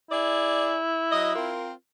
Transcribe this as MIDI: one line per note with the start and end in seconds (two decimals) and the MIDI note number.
0.11 1.56 64
0.11 0.76 68
0.11 0.76 74
1.12 1.32 54
1.12 1.32 75
1.35 1.71 60
1.35 1.71 65
1.35 1.71 70